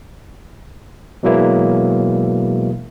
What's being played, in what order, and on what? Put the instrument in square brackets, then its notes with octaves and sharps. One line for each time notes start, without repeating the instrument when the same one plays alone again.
[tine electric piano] B2 E3 F#3 G#3 A#3 E4